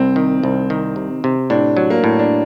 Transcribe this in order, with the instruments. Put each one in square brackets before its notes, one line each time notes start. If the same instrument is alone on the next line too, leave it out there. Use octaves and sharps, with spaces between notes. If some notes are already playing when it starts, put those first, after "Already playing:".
Already playing: [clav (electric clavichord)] C2 [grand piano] C4
[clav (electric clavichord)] D#3
C2
D#3
C3
C3
[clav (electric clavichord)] A2 [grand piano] D4
[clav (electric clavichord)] F#3
[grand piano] A#3
[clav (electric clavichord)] A2
[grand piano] D4